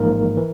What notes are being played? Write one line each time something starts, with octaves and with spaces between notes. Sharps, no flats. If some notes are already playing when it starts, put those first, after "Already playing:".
Already playing: A1 G#2 F3 A#3 A#4
E3